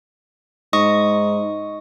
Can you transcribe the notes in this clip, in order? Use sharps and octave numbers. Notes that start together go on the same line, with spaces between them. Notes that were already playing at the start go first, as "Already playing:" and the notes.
G#2 D#5 C#6 D#6